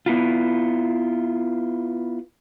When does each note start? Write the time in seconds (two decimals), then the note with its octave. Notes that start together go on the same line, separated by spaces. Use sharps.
0.06 B3 E4 F4